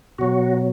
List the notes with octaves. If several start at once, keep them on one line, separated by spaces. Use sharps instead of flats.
B2 F#3 F#4